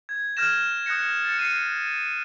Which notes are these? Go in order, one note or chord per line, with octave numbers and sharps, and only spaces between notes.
G#6
F6 G6 G#6 A#6 E7
D#6 F#6 G6 A#6 C#7
A6 C#7
C7 C#7 D#7